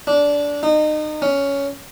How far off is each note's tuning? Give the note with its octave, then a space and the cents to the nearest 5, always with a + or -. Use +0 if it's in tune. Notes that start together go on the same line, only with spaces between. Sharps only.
D4 -15
D#4 -30
C#4 +10